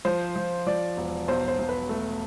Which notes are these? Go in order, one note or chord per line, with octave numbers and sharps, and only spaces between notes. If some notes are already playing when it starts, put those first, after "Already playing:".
F3 C5
F3
F3 D5
E1
B1 C5
C5
B1
B4
A3